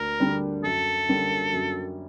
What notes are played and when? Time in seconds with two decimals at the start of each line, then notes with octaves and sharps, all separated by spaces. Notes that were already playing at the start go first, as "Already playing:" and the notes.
Already playing: D2 A#3 D4 A#4
0.20 D3 G3 A#3 D4
0.63 F#2 A4
1.09 D3 G3 A#3 C#4
1.53 F#2